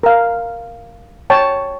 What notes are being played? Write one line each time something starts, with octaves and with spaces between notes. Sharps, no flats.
A#4 F5
C#5 G5 A5